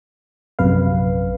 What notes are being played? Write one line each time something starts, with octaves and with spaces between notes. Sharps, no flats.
A#1 F#2 C3 B4 F5